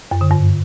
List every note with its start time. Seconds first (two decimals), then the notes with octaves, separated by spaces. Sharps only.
0.11 F#2
0.21 D3
0.31 G2